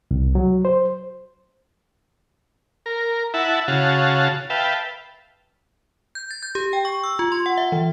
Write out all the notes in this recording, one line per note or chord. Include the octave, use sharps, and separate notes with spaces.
C2
F#3
C5
A#4
E4 E5 F#5 A5
C#3 F#4 F5 A5
B4 E5 F5 G5 A5
G6
A6
G6
G4
G5
C#6
E6
F4
C6
F#5
E5
E3